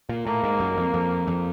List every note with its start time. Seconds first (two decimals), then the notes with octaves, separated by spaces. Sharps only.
0.09 A#2
0.26 A2 A#3
0.44 G#2
0.60 F#2
0.77 F2
0.94 F2
1.27 F2